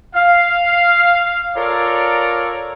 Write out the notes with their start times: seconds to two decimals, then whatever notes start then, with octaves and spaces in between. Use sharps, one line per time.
0.15 F5
1.56 F4 A4 A#4 C#5 D5 A#5